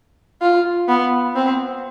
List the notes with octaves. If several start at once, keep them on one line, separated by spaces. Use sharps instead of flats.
F4
B3
C4